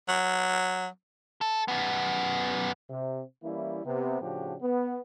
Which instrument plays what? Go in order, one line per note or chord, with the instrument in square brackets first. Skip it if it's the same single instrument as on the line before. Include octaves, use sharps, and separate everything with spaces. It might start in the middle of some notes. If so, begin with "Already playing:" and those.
[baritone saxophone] F#3
[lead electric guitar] A4
F#2 B3
[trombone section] C3
E3 G3 A#3 C#4 E4
C3 B3
A2 C#3 F3 D4 F#4 G4
B3